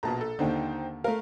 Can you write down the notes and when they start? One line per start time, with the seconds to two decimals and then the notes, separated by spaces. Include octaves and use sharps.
0.03 A#1 B2 A5 A#5
0.21 A4
0.39 D#2 D3 D#4 C5 G5
1.04 A3 A#4 F5